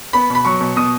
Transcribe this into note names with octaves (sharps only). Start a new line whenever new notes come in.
B3 B5
B2 B5
F#3 C#6
B2
B2 D#6